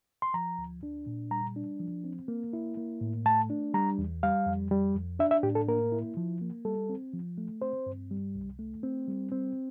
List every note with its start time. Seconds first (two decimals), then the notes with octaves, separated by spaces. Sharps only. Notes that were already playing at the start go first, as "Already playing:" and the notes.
0.22 C6
0.34 F3 A#5
0.58 D2
0.83 D4
1.06 A#2
1.31 G3 A#5
1.56 D4
1.80 F3
2.04 C4
2.28 A#3
2.53 E4
2.77 A#3
3.01 A2
3.26 A3 A5
3.50 D4
3.74 G3 A#5
3.98 E2
4.23 G3 F5
4.46 F2
4.71 G3
4.96 F2
5.19 D4 E5
5.31 E5
5.43 A2 G4
5.55 A4
5.68 A#3 A#4
5.92 E4
6.17 F3
6.41 A#3
6.65 G3 A4
6.89 C4
7.13 F3
7.38 A3
7.62 C4 C5
7.86 G2
8.11 G3
8.35 C2
8.59 A3
8.83 C4
9.08 G3
9.32 C4